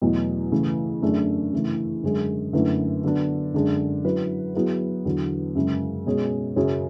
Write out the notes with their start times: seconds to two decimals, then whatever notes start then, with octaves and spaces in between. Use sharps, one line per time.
0.02 E2 B2 F#3 A3
0.52 C#3 E3 A3
1.02 F#2 D3 A3 D4 G#4
1.53 C#3 E3 A3
2.03 F#2 D3 G#3 C#4 G#4
2.53 F#2 D3 A3 E4 B4
3.04 D3 F#3 B3 D4
3.54 F#2 D3 G#3 D4 G#4
4.05 F#3 C#4 E4 B4
4.55 F#3 B3 E4 G#4 B4
5.05 E2 D3 F#3
5.55 F#2 C#3 G#3
6.06 B2 G#3 C#4 G#4
6.56 F#2 C#3 F#3 C#4 G#4